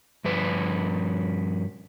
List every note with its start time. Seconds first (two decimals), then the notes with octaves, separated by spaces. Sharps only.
0.25 G2 F3 B4